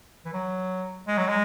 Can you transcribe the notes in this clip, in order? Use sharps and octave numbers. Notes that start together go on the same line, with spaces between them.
E3
F#3
G#3
F#3
G#3